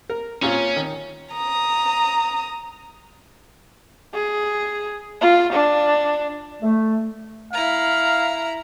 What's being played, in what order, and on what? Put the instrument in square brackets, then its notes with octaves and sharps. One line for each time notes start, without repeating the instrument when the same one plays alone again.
[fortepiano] A#4
[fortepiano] A#2 C4 F4 [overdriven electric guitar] C#4
[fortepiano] D#3
[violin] A#5 D#6
[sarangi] G#4
F4
D4
[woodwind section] A3
[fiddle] E4 A#5 [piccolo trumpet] F5